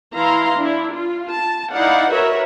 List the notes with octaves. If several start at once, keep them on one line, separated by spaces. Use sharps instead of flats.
E3 E4 F5 A#5 C6
D4 E4
F4
A5
D#4 E4 D5 F5 F#5
F#4 A#4 B4 C#5 E5